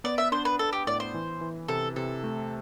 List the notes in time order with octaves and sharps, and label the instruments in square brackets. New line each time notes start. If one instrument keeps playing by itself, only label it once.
[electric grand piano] B3 [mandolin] D5
[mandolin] E5
[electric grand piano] D4 [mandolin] C5
[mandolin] B4
[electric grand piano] D4 [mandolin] A4
[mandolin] G4
[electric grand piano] A2 [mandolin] D5
[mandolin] C5
[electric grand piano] E3
E3
[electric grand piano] C3 [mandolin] A4
[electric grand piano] C3 [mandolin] A4
[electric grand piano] A3